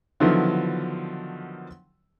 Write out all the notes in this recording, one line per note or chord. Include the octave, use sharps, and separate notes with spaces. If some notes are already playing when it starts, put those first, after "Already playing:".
D3 D#3 F3 F#3 B3 E4